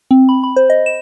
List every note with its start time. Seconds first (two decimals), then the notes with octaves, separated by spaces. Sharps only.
0.11 C4
0.29 B5
0.44 B5
0.56 C5
0.70 D#5
0.86 E7